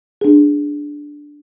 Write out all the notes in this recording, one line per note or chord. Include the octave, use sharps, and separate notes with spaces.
D4 G#4